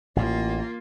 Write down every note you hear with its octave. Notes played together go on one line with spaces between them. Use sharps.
A1 A2 A#3 F4